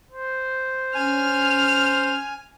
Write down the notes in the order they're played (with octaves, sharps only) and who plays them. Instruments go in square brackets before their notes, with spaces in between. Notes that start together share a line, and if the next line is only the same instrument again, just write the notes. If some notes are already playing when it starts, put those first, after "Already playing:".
[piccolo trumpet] C5
[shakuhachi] C#4 [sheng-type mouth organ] G#5 [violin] F6